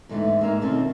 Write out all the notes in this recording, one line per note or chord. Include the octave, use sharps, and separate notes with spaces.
E2 G#2 D3 E3 A3 B3
G#2 A#3 G#4 A#4 E5 F5
B2 D3 D#3 C4 C#4 F4